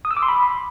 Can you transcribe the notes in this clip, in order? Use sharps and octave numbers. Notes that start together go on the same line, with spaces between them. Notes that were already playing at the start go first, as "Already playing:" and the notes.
D#6
E6
D6
C6
B5